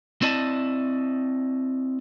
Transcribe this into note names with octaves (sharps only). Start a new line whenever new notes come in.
C4 E4 D5 D#5 A5